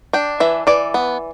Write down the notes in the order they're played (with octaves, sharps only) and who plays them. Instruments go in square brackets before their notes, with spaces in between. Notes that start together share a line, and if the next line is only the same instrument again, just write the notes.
[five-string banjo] D4 G5
E3 E5
E3 D5
B3